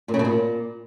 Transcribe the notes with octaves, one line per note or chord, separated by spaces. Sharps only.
A#2
C#3
B2
A#2